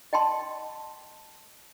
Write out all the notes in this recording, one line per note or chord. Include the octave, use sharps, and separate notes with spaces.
D#5 G5 A5 C6